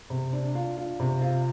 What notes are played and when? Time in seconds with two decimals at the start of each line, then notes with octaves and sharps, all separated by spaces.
0.10 C3
0.33 D4
0.55 F4
0.77 F4
1.00 C3
1.22 F4